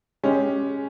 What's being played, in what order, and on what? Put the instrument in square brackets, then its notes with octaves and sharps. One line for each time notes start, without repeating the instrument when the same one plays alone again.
[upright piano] G#3 C#4 G4